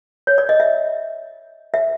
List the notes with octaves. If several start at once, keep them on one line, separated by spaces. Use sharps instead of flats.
C#5
D5
D#5
E5
E5